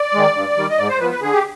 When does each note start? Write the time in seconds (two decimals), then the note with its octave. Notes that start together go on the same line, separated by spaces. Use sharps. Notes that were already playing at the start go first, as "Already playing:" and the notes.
Already playing: D5
0.14 D#3 G#3
0.35 G2
0.57 D#3 G3
0.70 D#5
0.78 G#2 D5
0.89 C5
1.00 F3 B3 B4
1.11 B4
1.22 D3 G#4
1.33 G4